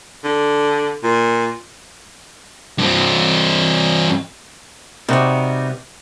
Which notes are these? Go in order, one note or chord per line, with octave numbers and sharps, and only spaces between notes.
D3
A#2
G2 C4
C3 G3 B3 D#4 F#4